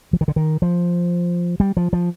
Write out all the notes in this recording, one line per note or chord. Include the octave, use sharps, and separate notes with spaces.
F3
D#3
D3
D#3
F3
G3
F3
F3